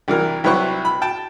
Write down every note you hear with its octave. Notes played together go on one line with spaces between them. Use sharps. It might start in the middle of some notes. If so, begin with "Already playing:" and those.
C2 E3 A#4
C2 F#3 E4 B4 C5 C#6
B5
G5 A5